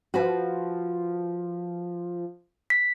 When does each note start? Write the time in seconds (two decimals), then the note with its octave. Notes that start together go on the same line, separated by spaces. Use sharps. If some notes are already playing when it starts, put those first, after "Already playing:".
0.14 F3 F#4 B4
2.70 B6